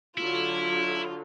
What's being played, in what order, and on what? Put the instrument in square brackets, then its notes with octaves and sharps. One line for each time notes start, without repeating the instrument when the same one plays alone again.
[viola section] D3 F#3 [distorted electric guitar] E4 [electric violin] F4